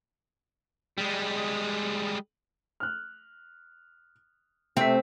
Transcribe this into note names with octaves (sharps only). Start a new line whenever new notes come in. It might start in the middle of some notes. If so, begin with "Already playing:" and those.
G3 G#3
F6 F#6
C3 A3 C4 B6